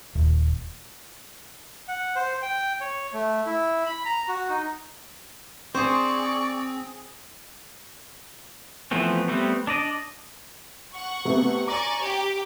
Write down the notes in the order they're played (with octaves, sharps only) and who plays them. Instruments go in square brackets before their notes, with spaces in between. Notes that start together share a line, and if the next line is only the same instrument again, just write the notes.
[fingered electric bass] D#1
[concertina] F#5
C5
G5
C#5
A3
E4
B5
A#5
F#4
D#4
[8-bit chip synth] C4 [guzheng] G#4 C5 [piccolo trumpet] D5 [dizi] C#6
[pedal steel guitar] E3 F3 A3 B3 C4
G3 A3 B3 C4
D4 D5 D#5
[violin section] F#5 C#6
[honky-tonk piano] C3 A3 B3
[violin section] D5 G#5 C#6 [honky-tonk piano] A#5 D6 A#6
[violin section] G4